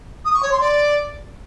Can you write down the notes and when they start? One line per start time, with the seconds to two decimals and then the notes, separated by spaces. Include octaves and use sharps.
0.25 D#6
0.34 C#6
0.42 C#5
0.51 C6
0.60 D5